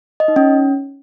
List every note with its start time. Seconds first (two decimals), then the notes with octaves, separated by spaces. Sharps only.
0.20 D#5
0.28 D#4
0.36 C#4